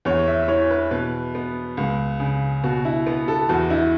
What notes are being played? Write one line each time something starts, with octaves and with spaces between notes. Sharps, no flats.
E2 C#5
E5
E3 C#5
B4
B2 B4
B3
C#2
C#3
B2 F#4
E4
B3
A4
E2 F#4
E4